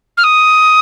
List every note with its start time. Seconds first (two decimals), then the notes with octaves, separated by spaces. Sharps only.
0.17 F6
0.24 D#6